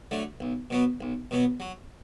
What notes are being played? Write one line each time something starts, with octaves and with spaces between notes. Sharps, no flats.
D3 F#3 A3
B1
B2 F#3 B3
B1
B2 F#3 B3
F#3